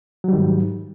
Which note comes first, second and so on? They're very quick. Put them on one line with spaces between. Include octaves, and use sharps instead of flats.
F#3 G3 D#3 G#2